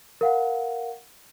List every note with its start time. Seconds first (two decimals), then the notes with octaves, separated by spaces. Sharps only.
0.21 A#4 F5 F#5